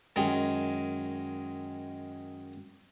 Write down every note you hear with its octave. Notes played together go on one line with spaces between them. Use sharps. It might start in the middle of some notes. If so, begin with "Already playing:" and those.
F#2 D#3 G#3